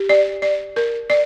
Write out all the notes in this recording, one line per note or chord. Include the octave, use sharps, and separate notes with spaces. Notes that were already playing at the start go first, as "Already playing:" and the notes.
Already playing: G4
D5
D5
A#4
D5